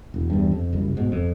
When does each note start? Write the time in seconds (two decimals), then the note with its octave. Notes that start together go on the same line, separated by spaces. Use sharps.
0.14 E1
0.30 E2 G2
0.52 F2
0.73 F#1 C2
0.97 G#2 B2
1.12 F2